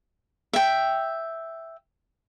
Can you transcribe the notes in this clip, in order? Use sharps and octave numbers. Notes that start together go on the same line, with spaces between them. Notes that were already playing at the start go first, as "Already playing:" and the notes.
E5 G5